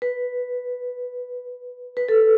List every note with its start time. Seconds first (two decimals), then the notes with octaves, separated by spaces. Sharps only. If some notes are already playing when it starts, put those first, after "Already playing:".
0.02 B4
1.97 B4
2.09 A4